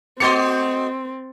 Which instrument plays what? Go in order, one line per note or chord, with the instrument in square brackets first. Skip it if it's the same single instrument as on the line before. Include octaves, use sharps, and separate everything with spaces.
[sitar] A3 F#4 D#5 [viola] C4 [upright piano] C6 A6 C#7